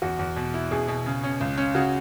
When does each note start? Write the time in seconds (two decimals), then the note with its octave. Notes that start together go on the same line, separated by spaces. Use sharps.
0.02 E2 F#4
0.19 E2
0.36 B2
0.54 E4
0.71 B2 G#4
0.88 B2
1.06 C#3
1.24 C#4
1.41 C#2
1.58 C#4
1.75 C#3 F#4